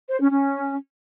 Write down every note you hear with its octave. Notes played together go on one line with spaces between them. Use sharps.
C5
C#4
C#4